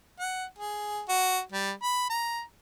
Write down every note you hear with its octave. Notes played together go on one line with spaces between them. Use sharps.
F#5
G#4
F#4
G3
B5
A#5